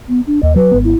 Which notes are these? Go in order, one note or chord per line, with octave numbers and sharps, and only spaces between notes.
B3
D4
D#2 D#5
F#3 B4
G#1 B3
E4